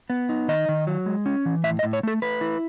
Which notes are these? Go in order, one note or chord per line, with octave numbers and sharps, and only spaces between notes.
B3
D#4
D#3 D#5
D#3
F#3
G#3
C#4
E3
A2 E5
D#5
A2
C#5
A3 A4
A3 B4
E4